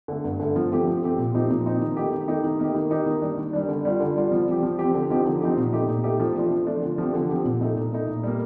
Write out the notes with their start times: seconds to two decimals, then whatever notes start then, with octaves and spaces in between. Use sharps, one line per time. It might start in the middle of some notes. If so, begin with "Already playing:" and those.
0.08 D3 A3
0.24 G2
0.40 D3 A3
0.56 F3
0.71 A3 C4 G4
0.87 F3
1.03 A3 C4 G4
1.18 A#2
1.34 F3 C4 D#4 G4
1.50 A#2
1.65 F3 C4 D#4 G4
1.81 D#3
1.97 A3 D#4 G4
2.12 D#3
2.28 A3 D#4 G4
2.44 D#3
2.59 A#3 D#4 G4
2.75 D#3
2.90 A#3 D#4 G4
3.06 D#3
3.22 G3 D4
3.38 D#3
3.53 G3 D4
3.68 D3
3.85 G3 D4 F4
4.00 D3
4.16 G3 D4 F4
4.31 F3
4.47 C4 G4
4.63 F3
4.79 C4 G4
4.94 D3
5.10 F3 C4 D#4 G4
5.26 D3
5.41 F3 C4 D#4 G4
5.57 A#2
5.73 A3 D#4 G4
5.88 A#2
6.04 A3 D#4 G4
6.20 F3
6.35 A3 D4 F4
6.51 F3
6.66 A3 D4 F4
6.82 D3
6.98 F3 C4 G4
7.14 D3
7.29 F3 C4 G4
7.45 A#2
7.61 A3 D#4
7.76 A#2
7.92 A3 D#4
8.08 A#2
8.23 G3 A#3